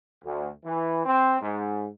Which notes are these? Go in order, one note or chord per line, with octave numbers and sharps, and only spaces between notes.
D2
E3
C4
G#2